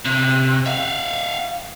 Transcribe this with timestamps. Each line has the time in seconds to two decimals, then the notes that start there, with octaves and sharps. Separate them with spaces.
0.05 C3
0.66 E5 F5